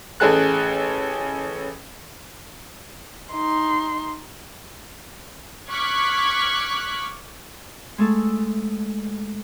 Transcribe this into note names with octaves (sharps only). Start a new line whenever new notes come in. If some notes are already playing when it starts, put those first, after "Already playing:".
A1 C#4 G#4 A4 F#6
D#4 C6
C#6 D6 F6 F#6 G#6 B6
G#3 A3 A4